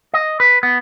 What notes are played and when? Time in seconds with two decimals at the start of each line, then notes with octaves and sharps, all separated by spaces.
0.14 D#5
0.40 B4
0.63 B3